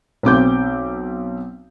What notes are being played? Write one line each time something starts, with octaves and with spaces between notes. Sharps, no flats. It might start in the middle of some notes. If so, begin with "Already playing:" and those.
B1 C4 D6 G6